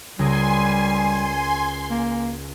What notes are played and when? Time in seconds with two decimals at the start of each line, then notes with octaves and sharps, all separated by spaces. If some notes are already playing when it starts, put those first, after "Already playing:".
0.19 C#2 G3 A#4 G#5 C6 D#6
1.91 A#3